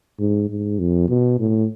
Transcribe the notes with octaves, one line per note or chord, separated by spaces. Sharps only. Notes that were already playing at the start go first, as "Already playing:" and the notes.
G#2
G#2
F2
B2
A2